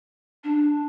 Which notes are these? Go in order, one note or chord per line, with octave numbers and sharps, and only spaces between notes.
D4